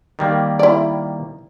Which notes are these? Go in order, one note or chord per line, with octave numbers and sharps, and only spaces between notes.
D#3 G3 A#3
E4 D5